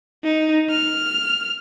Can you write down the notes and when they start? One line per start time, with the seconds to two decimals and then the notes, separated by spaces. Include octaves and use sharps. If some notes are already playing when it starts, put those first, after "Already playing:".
0.24 D#4
0.70 F6